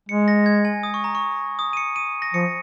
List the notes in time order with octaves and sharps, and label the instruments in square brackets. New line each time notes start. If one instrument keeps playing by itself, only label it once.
[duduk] G#3 [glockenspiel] C#7
[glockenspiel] A#6
G#6
G#5
D#6
C#6
A#5
C#6
D#6
D#7
C#7
D#7
A#6
[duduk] F3 [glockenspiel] C#7